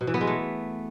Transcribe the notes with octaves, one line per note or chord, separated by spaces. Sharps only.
B2
E3
B3
G#3
A3